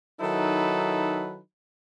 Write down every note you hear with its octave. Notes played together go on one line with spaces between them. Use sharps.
D#3 F#3 D#4 E4 A4 B4